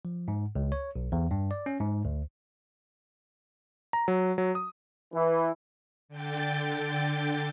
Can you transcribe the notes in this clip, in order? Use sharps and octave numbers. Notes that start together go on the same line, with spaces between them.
F3
G#2
C#2
C#5
B1
E2
G2
D5
C#4
G#2
D2
A#5
F#3
F#3
D#6
E3
D3 G5 A6